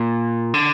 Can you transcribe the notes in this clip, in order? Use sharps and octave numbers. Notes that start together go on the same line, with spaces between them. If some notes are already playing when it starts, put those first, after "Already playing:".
Already playing: A#2
D3